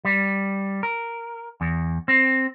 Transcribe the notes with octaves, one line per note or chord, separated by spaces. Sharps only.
G3
A#4
E2
C4